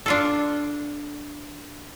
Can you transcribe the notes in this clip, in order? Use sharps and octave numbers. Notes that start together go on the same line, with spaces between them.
D4 F4 A4